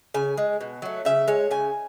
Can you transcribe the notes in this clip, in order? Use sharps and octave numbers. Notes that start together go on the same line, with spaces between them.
C#3 G#5
G#3
B2
F#3 A3
C#3 E5
G#3 C#5
C#3 G#5